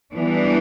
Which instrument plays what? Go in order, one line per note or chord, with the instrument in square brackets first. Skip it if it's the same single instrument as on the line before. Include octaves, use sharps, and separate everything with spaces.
[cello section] E3 G3 B3 D4